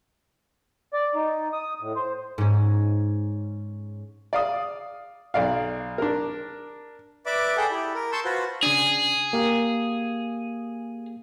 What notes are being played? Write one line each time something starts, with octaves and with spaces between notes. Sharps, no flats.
D5
D#4
D#6
A2
C5
G#2 C#4
D5 F5 D#6
B1 D5 F5
D4 A#4
B4 D5 E5 B5 D6
G#4 A4 D5 F#5 G5
E4 G4
A#4
A5 C6 C#6 E6 G6
F4 F#4 B4 C5
C#3 D4 G#4
A#3 G4 F5